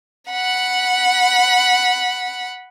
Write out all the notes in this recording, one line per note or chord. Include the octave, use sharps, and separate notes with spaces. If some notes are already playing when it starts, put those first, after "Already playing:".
F#5 B5